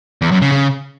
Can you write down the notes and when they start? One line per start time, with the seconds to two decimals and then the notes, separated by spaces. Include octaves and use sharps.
0.22 E2
0.32 F#2
0.42 C#3
0.52 C#3